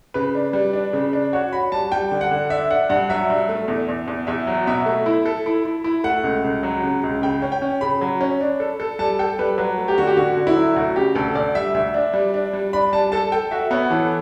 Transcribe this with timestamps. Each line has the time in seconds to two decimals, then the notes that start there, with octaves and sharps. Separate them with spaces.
0.14 C#3 B4
0.35 D4
0.53 G3
0.73 D4
0.93 C#3
1.13 D4
1.33 F#4 C#5
1.53 F#4 B5
1.72 G3 A5
1.92 G3 G5
2.12 D3
2.21 F#5
2.31 D3
2.50 D4 E5
2.71 D4 F#5
2.90 G2 F#5
3.09 F#3 E5
3.30 G2
3.49 A3
3.68 E2
3.88 E2
4.08 E2
4.27 E2 E5
4.47 F#3
4.67 B2 E5
4.86 A3
5.06 E4
5.26 A4
5.46 E4
5.65 E4
5.84 E4
6.04 A3 F#5
6.24 C#2
6.44 C#2
6.63 F#3
6.84 C#3
7.03 C#2
7.22 C#3 G5
7.42 C#4
7.52 G5
7.62 C#4
7.81 C#3 B5
8.01 F#3
8.21 C#4
8.41 D4
8.60 A4
8.80 A4
8.99 G3 A5
9.19 A4 G5
9.39 G3 B4
9.58 F#3 B4
9.78 A3
9.88 G4
9.98 D3 F#4
10.07 G4
10.17 D3 F#4
10.37 D3
10.47 E4
10.56 F#3
10.76 D2 F#4
10.96 C#3 G4
11.15 D2 A4
11.35 D2 D5
11.55 G3 E5
11.74 D2 E5
11.94 D4
12.14 G3
12.34 D4
12.53 G3
12.73 D4 B5
12.93 G3 A5
13.12 A4 A5
13.32 A4 G5
13.51 F#4 E5
13.71 B3 C#5
13.90 E3 A4